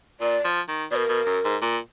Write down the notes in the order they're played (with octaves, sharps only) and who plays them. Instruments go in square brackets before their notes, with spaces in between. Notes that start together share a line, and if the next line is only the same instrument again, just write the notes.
[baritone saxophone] A#2 [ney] D5
[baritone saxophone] F3
D#3
[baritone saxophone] B2 [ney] A#4 D5
[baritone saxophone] B2
F#2
G#2
A#2